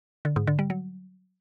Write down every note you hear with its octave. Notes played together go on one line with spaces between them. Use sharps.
D3
G#2
D3
G3
F#3